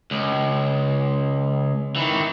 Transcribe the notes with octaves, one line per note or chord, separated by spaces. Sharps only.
C#2
D#3 E3